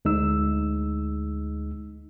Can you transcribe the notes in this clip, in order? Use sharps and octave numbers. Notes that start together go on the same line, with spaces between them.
D2 G#3 D#4 E6